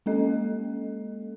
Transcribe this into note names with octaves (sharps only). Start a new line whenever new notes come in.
G#3 A#3 C#4 A4 D#5